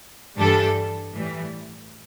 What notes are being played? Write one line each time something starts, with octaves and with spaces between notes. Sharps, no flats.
G2 E3 G3 D4 A4
A2 E3 G3